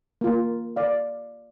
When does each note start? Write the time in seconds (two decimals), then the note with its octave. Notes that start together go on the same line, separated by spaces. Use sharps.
0.21 A#3 F4
0.76 D5 F5